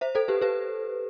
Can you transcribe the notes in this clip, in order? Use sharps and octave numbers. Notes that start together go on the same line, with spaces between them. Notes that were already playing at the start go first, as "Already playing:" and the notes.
C5 E5
A4 C5
G4 B4
G4 B4